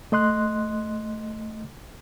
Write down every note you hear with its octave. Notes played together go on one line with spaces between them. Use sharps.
A3 D#5 C6 F#6